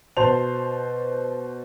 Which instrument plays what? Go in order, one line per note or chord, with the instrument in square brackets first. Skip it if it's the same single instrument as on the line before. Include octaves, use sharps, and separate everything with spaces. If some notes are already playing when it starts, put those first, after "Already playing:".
[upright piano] B2 C5 A5 C6 F7